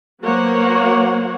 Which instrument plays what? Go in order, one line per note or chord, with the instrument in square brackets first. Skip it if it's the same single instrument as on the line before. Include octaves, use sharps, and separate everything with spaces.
[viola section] F#3 A#3 B3 C5 C#5 F#5